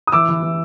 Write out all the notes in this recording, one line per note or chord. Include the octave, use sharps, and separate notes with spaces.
D#6
E3 D6 E6
E3
E3